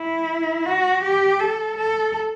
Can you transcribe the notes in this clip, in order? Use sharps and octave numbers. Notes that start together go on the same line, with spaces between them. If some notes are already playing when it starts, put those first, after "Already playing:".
Already playing: E4
F#4
G4
A4
A4